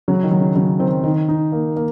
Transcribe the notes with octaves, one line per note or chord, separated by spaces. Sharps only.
C#3 F#3
D#3
F#3
C#3
C#3 F#3
D#3 C4
D#3 D#4
D#4
A#3
A#3